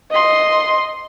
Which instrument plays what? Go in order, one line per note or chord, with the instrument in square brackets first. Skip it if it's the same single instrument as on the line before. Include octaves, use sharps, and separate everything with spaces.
[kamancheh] D#5 C6